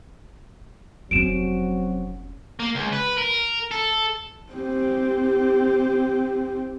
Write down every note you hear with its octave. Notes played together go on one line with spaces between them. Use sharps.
F1 F#3 C4 C#4 F#4 D7 E7
A#3
C#2
B4
A#4
A4
C4 G4